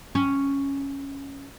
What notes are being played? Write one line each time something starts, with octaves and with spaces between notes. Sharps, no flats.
C#4